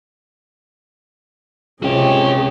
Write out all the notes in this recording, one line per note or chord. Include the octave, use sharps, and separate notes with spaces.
C#2 C3 F#4 G#4 C#5 G5